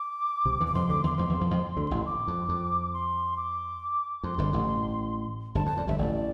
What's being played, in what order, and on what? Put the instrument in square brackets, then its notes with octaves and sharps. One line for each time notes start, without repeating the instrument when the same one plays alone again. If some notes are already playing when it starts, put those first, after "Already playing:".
Already playing: [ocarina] D6
[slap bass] C2 C3
E2 E3
[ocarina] D6
[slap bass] F2 F3 [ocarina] C6
[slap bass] D2 D3 [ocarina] D6
[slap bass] E2 E3 [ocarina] C6
[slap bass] F2 F3 [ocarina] C6
[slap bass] E2 E3
F2 F3
F2 F3
D2 D3
A1 A2
[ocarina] D6
[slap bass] F2
F2
[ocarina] C6
D6
[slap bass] F2 [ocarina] C6
[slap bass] G1 G2
A1 A2
[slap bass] G1 G2 [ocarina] A5
[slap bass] F2 [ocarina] A5
[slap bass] F2 [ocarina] D5
[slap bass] G1 G2 [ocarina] E5
[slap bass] A1 A2 [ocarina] D5